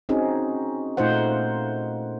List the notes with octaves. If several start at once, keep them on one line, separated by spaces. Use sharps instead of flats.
C4 C#4 D#4 F#4 G#4
A#2 A3 D#4 F4 C5 F#5